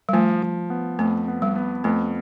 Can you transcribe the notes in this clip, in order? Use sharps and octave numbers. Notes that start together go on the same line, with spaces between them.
G3
F3 A3
F3
B3
F2 A3
B3
G3
B3
F2 A3